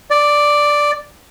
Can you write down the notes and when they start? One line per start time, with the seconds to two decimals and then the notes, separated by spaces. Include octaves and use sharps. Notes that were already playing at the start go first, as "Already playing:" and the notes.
0.11 D5